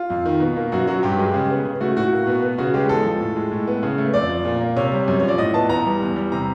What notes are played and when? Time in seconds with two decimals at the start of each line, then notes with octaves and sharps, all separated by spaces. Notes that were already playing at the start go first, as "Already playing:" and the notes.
Already playing: F4
0.10 F2
0.26 D#3
0.40 B2
0.56 A#3
0.72 F#2 F#4
0.87 F#3 F#4
1.03 G2 G4
1.19 G#3
1.34 C#3
1.50 B3
1.65 C#3
1.80 A3 F#4
1.97 A2 F#4
2.12 A#3
2.27 B2
2.43 B3
2.58 C#3 F#4
2.74 G#3 G4
2.89 E2 A4
3.05 F3
3.20 A2
3.36 G#3
3.52 A2
3.68 B3
3.83 C#3
3.98 A3
4.13 F2 D5
4.29 F3
4.45 A#2
4.60 A#3
4.76 C3 C#5
4.92 G3
5.08 F#2
5.20 F3 C#5
5.28 D5
5.38 A2 D#5
5.54 B3 A5
5.69 E2 A#5
5.85 G3
6.00 E2
6.16 G3
6.32 C3 A#5